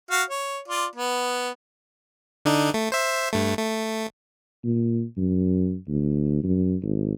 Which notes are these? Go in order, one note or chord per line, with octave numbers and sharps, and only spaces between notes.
F#4 F5
C#5
F4 D5
B3
D3 D4 D#4
A3
C5 E5
G2 A3
A3
A#2
F#2
D2
F#2
G#1